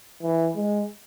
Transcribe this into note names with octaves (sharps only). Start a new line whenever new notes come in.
E3
G#3